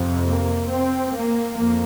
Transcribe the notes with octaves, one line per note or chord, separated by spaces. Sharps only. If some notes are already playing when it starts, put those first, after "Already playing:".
Already playing: F2 C3
A#3
C4
A#3
F2 A#3